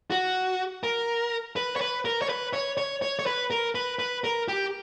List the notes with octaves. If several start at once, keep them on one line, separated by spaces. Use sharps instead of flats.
F#4
A#4
B4
C#5
B4
A#4
C#5
B4
C#5
C#5
C#5
C#5
B4
A#4
B4
B4
A#4
G4